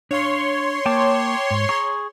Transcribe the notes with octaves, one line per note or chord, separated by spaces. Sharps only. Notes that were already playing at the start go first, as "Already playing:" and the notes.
D4 C#5 F5 C6
A#3 G5 A5 D6
G#2
G#4 A#5 C#6